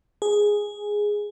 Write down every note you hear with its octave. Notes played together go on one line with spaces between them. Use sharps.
G#4